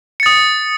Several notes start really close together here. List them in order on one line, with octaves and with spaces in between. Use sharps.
C#7 A6 D#6